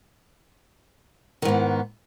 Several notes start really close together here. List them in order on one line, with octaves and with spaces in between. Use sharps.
D#3 G#2 B3